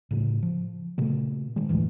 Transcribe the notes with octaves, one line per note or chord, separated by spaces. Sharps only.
A2 C#3
F3
A#2 C#3 A3
D#3 G#3
F#1 D2 A2 E3